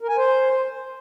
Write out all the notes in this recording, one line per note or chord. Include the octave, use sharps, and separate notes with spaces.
A#4
G#5
C5